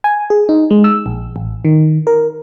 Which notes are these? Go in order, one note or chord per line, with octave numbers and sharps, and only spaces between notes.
G#5
G#4
D#4
G#3
E6
A#1
A1
D#3
A#4